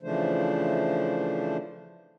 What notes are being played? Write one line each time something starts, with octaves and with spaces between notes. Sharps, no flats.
C#3 E3 F3 A3 D4 C5